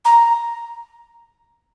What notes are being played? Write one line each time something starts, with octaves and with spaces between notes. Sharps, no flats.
A#5